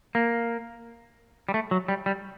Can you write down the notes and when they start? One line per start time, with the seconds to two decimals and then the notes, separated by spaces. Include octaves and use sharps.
0.15 A#3
1.49 G3
1.54 A3
1.71 F#3
1.88 G3
2.06 G3